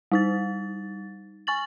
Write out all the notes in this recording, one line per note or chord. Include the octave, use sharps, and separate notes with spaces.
G3 D#4 A6
G#5 C#6 A6 F#7